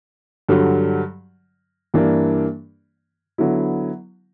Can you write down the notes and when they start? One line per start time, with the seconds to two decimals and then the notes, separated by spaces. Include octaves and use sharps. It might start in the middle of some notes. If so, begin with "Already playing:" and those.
0.49 G2 D3 F#3
1.94 G2 E3 A#3 D4
3.38 D3 F#3 B3 E4